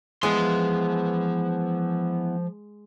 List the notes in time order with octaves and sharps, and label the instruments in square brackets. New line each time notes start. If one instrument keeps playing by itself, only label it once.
[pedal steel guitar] E3 B3 [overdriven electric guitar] F3 C6 [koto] G#3